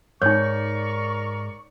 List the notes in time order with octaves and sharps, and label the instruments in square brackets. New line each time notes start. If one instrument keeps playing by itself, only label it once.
[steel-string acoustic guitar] G#2 [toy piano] D#4 C#5 [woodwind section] A#4 D5 C#6